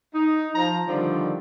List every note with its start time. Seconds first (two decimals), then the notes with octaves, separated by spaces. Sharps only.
0.15 D#4
0.56 F3 A#5
0.87 D3 D#3 F3 G3 C4